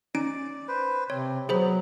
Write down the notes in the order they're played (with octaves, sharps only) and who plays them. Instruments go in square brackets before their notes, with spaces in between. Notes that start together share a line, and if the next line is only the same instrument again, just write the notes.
[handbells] C#4 D#4 D7 [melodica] D5
[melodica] B4 C5
[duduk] C3 [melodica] C4 [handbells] C#5
[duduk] F#3 [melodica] B3 [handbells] G#4 C5 B5